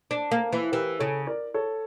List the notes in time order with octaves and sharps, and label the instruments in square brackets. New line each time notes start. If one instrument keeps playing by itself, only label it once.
[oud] D4
A#3
E3
[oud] E3 [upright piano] G4 A#4
[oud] C#3 [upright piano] A4 C#5
[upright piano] A#4 D5
A4 C#5